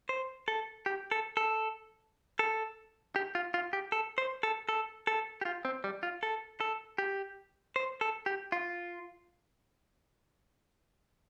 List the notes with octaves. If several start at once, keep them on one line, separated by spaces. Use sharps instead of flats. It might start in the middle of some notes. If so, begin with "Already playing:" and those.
C5
A4
G4
A4
A4
A4
G4
F4
F4
G4
A4
C5
A4
A4
A4
G4
F4
C4
G3
F4
A4
A4
G4
C5
A4
G4
F4